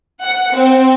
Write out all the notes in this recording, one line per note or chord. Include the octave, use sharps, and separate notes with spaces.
F#5
C4